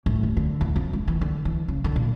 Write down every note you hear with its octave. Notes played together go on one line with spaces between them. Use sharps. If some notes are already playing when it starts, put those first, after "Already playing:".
A2
D#2
D3
E2
F2
G#3
E3
D3
E3
C#3
D3
A#2